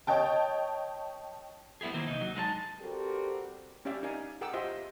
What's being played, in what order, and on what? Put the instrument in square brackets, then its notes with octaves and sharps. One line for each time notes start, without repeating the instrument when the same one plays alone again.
[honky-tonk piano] C#5 D#5 G5 A5
[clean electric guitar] G3 B3 E4 G4 G#4
D#3 E3 A#3 C4
C2 D#4
F#3
G#3 D#4 B4 A5
[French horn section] G3 C4 F#4 G4 A4 A#4
[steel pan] C#4 G4 D5 E5 F5
D#4 A#4 D5 F5 G#5
G#4 A#4 F#5 G5 D6 E6
F4 G4 C5 D#5 E5 C6